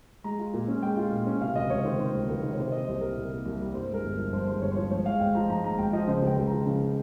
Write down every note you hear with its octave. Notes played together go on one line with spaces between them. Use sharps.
G#3 A#5
F4
A#2
C#4
G#3 G5
F4
A#2
C#4
C3 F5
C#2 D#5
C#2 C#5
D#3 C5
A#4
C3 C5
C#2
C#2 A#4
D#3
C#5
C3 C5
A#3 D#5
C2 C5
G3 A#4
C3
A#3
C2
G3
G2 C5
G#3
A#4
G1
F3
G2 C5
G#3 C5
G1 C#5
C5
F3 C#5
G#2 C#5
G#3 F5
G#1 G5
F3 A#5
G#2 A#5
G#3 A#5
G#1 G5
F3 D#5
C#3 C5
C#2 G5
C#2
F3 A#5
C#3